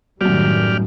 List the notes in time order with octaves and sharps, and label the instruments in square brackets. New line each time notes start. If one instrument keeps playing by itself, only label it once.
[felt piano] F#2 F#3 [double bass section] A2 D#3 G3 [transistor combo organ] G4 D5 F6